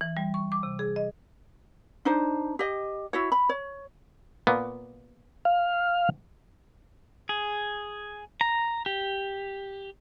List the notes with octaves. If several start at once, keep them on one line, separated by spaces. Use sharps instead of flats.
E3
G3
C#6
D6
C3
G#4
D#5
D4 D#4 C5
G4 D#5
E4 F#4 C#5
B5
C#5
A#2 A#3 B3
F5
G#4
A#5
G4